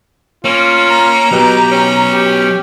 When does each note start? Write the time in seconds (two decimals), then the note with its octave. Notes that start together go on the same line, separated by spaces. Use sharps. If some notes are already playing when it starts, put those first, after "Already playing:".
0.45 A#3 C#4 F4
0.90 A#5
1.32 B2 F#3 B3 G4
1.72 C#4
2.12 G4